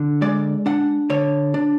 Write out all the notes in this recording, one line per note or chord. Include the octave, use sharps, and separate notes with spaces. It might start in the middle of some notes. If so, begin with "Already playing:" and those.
Already playing: D3
G#3 D5
D4 F#5
D3 C#5
D4